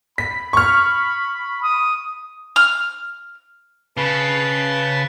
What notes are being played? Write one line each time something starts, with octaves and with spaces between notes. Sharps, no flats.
B5 B6
C#6 F6
D#6
F6
C#3 B4 A5